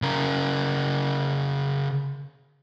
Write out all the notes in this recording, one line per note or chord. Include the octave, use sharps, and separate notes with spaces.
C#3 A#4